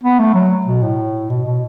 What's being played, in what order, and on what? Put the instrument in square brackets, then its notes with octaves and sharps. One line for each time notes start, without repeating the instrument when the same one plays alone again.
[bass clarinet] B3
A3
F#3
B2
A2
B2
B2